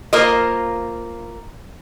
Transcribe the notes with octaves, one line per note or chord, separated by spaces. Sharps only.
A#3 F4 A#4 C5 D#5